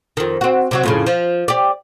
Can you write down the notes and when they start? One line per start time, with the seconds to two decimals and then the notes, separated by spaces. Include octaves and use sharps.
0.17 F2 D#3
0.41 C4 F#4
0.71 C3 F#3 F#4
0.83 F2 A2 C#3
1.06 F3
1.48 G4 D5